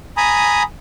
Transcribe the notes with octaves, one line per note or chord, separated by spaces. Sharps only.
G#5 A#5 B5 D#6